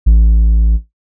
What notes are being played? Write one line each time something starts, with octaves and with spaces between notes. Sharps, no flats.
A1